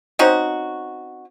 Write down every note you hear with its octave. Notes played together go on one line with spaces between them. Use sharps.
C4 C#4 D#4 F#4